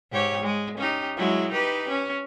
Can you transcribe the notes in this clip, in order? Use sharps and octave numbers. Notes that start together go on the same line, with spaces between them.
G#2 G4 C#5
G#3
C#4 D#4 G4
F#3 G#3 E4
D#4 G4 B4
C#4